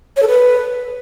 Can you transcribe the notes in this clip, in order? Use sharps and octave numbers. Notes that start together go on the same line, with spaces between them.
C#5
A4
B4